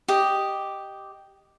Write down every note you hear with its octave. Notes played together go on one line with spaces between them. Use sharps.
G4 D#5